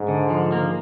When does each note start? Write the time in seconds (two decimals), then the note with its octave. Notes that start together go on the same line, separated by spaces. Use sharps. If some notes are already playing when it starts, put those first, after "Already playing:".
Already playing: G#2
0.08 D3
0.30 F3
0.52 A#3